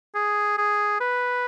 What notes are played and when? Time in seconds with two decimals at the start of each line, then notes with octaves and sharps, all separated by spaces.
0.15 G#4
0.58 G#4
1.00 B4